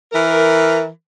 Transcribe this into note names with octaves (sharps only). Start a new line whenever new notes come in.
E3 A#4